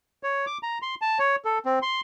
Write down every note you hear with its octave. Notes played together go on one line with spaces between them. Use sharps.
C#5
D6
A#5
C6
A5
C#5
A4
C4
C6